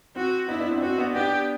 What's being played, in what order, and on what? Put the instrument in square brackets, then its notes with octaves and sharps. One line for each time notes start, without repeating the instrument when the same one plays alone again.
[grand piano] C4 [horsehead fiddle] F#4
[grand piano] B3 D4 [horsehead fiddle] E4
[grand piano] B3 D4
C4
D4
[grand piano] C4 [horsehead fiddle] F#4
[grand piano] B3 D4
[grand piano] B3 D4 [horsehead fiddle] G4